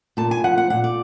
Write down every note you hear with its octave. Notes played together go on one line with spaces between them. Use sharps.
A#2 A5
G#5
F3 F#5
F#5
A#2 F#5
D5